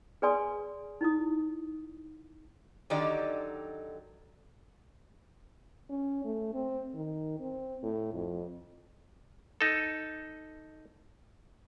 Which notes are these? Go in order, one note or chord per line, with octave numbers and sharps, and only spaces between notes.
G#4 B4 D5 G#5 C6 D#6
D#4 E4 D#6
D3 D#3 F#3 D#4 G4 D5
C#4
A3
C4
D#3
C4
A2
F2
D#4 A4